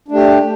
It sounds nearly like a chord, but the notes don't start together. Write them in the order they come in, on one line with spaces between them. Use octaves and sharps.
D4 A3 G4